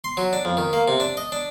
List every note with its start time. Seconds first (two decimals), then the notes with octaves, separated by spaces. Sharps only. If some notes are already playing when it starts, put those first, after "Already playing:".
0.04 C6
0.17 F#3
0.33 D4
0.45 F2
0.57 D#3
0.73 A#3
0.88 C3
1.00 D4
1.17 D#5
1.32 D4